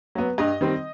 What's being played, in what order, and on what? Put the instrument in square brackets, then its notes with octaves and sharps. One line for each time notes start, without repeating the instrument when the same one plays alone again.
[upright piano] F#3 B3
G2 D#5
D#3 G3 C4